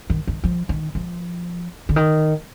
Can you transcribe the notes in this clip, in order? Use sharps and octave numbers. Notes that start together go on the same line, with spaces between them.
D#3
D#3
F3
D#3
F3
D3
D#3